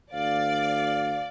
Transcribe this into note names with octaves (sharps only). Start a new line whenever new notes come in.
D2 D5 F5